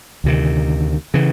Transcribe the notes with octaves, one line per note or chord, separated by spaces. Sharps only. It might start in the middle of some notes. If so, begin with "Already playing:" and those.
D2 C3 D#3
C#3 E3